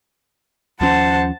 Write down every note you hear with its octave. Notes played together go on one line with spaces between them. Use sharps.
D#2 F3 C#4 C5 F#5 A5